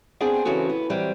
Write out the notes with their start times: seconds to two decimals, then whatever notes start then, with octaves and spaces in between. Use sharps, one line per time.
0.20 B3 C4 D4 G#4 G5 G#5
0.45 C#3 E3 C4 C#4 F#4 A4
0.69 B3
0.90 E3 F#3 G3 C4